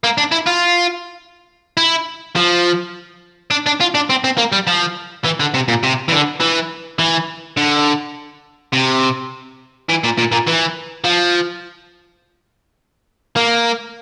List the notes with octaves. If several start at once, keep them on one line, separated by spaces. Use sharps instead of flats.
A#3
D4
E4
F4
E4
F3
D4
D4
F4
D4
C4
C4
A#3
G3
F3
E3
D3
C3
A#2
C3
E3
D3
E3
E3
D3
C3
E3
A#2
A#2
A#2
E3
F3
A#3